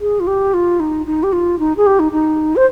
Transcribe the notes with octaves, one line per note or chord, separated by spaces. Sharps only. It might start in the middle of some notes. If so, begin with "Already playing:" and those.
G#4
F4
G4
F4
D#4
D#4
G4
F4
D#4
G#4
G4
D#4
D#4
C5